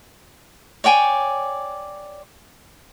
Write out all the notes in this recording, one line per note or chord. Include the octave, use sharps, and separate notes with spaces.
C#5 D5 G5 G#5